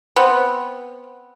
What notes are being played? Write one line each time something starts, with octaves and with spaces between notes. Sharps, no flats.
B3 C4